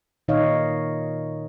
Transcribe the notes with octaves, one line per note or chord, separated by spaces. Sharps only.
A#2 D#3 D#4 C#5 D#5 F5